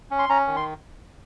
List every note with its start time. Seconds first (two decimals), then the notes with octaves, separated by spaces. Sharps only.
0.11 C#4
0.19 C6
0.29 C#4 A#5
0.47 D#3
0.56 C6